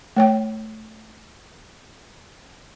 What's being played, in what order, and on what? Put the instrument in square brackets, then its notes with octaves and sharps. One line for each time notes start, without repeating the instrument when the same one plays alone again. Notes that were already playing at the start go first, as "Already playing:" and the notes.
[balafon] A3 C#5 G5